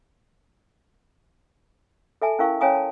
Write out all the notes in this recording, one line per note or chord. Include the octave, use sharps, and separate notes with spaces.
A4 E5 G#5 A5
C#4 E4 A#4 F5 C#6
C#4 C#5 F5 G#5 A#5 D#6
A5